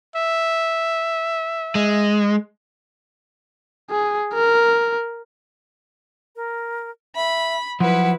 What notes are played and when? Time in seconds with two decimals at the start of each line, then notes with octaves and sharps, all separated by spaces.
0.16 E5
1.75 G#3
3.90 G#4
4.34 A#4
6.36 A#4
7.16 E5 B5
7.80 F3 F#3 E4 B4 F#5